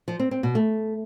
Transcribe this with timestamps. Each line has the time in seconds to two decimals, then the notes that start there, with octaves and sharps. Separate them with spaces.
0.08 F3
0.19 C4
0.31 C4
0.43 B2
0.55 A3